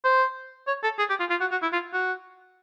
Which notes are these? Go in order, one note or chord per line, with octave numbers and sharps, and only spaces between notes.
C5
C#5
A4
G#4
G4
F4
F4
F#4
F#4
E4
F4
F#4